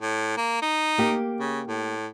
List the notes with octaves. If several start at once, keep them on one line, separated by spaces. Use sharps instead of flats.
A2
A#3
D#4
A#3 G4
C#3
A2